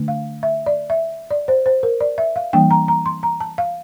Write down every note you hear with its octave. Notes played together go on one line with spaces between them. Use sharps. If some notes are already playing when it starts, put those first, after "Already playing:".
Already playing: D3 A3 D4
F5
E5
D5
E5
D5
C5
C5
A#4
D5
E5
F5
E3 G3 A#3 D4 G5
A#5
A#5
C6
A#5
A5
F5